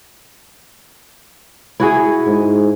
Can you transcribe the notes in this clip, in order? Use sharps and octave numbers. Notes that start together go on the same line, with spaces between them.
E4 F#4 G#4
G#2